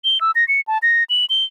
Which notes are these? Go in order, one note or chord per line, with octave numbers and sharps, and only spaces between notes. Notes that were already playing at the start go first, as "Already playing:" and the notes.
G7
E6
A#6
C#7
A5
A#6
F#7
G7